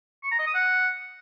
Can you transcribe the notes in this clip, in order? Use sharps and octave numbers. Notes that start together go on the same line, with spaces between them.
C#6
A#5
D#5
D#6
F#5